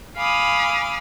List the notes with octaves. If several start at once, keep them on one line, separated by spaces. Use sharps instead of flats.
F5 G#5 B5 D6 D#6 F6